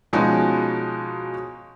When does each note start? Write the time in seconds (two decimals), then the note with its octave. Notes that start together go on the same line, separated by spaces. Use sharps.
0.13 B2 F3 G#3 C#4 D#4 F#4